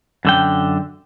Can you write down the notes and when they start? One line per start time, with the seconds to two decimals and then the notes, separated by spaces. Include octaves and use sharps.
0.25 F#2 D3 G5